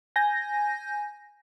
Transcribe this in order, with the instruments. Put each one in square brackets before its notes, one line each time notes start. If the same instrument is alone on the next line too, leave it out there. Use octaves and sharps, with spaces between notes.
[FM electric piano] G#5 G6 A#6